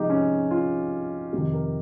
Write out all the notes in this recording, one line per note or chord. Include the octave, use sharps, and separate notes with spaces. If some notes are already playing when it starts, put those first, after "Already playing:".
Already playing: C3 F3 G#3 D#4 G4
C#4
F4
F2 C3 D#3 G4
A#4